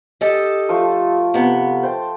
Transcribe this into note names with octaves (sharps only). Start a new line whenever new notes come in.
G4 A4 D#5
F3 A3 F4
C3 B3
C5 G5 A5